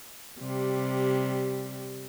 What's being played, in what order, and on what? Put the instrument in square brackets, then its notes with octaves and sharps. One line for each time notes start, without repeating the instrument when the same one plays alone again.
[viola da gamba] C3 G3